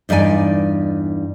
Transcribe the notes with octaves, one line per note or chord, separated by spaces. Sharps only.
E2 G2 D#4 D5 G#5